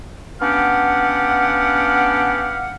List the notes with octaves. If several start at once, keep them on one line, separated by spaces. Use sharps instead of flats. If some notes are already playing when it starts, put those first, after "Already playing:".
B3 C#4 D4 G4 F5 F#5